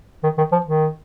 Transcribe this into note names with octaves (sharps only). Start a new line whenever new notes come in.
D#3
D#3
F3
D#3